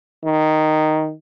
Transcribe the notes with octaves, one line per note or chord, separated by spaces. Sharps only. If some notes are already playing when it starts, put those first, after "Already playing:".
D#3